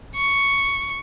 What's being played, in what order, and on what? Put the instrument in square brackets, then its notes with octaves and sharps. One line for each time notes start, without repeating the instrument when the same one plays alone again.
[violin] C#6